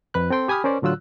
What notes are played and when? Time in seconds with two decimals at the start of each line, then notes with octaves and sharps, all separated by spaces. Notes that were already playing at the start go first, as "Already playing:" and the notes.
0.14 F2 B4 F#6
0.30 C4 A4 G5 C6
0.48 G4 G#5 B5 D#6 F6
0.64 C#4 A#4 C5 D5
0.82 A2 D3 F#3 F4 E6 F#6